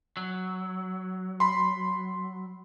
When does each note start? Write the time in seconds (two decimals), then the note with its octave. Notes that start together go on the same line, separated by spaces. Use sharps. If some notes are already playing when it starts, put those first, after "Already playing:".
0.17 F#3
1.40 B5 C6